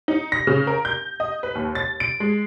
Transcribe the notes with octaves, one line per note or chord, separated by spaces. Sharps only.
D#4
A#6
C#3
A#4
G6
D#5
B4
D#2
A6
D7
G#3